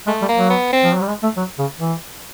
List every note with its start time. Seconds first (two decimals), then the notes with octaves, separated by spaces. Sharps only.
0.07 G#3 A3
0.22 G3
0.29 A#3
0.37 F#3
0.50 B3
0.73 C4
0.84 F3
0.94 F#3
1.02 G3
1.08 G#3
1.23 A3
1.37 F#3
1.59 C#3
1.81 E3